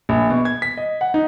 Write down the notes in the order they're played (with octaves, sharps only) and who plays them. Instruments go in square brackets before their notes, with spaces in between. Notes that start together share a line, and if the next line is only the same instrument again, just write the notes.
[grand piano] A#1
B2
G#6
B6
D#5
F#5
D#4